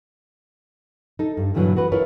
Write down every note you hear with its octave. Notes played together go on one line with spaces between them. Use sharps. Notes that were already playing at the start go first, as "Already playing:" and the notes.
D#4 A4
G2
G2 A#2 D3 E3 F#3
F#4 B4
E4 F4 G#4 A#4 B4 C#5